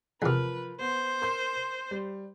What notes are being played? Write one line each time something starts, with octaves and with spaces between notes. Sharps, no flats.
E2 C3 F3 A#4 B4 F6
B3 C5
A#4 C6 G6
G3